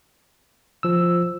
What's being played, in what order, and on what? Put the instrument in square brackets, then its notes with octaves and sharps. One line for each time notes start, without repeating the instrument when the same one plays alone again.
[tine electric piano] F3 E6